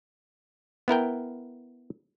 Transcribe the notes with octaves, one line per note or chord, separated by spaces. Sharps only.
B3 E4 A#4 G5